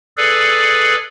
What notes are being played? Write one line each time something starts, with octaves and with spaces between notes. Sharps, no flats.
G#4 A4 B4 D5